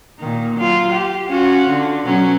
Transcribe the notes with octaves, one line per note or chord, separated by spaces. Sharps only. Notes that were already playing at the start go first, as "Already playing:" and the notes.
A#2 D#3
F#3 F4
G4
C#4 F4 F#4
D3
B2 F#3 C#4